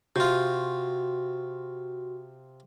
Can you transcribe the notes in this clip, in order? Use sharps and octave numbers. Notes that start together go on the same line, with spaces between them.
C3 F4 F#4